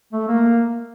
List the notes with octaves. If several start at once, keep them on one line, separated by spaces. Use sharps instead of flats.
A3
A#3